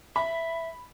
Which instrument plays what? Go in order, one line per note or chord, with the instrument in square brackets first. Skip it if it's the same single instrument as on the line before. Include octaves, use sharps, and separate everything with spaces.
[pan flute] E5 [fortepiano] B5